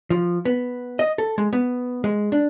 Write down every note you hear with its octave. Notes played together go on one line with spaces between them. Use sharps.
F3
B3
D#5
A4
G#3
B3
G#3
D4